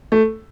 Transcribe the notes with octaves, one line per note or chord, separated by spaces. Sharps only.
A3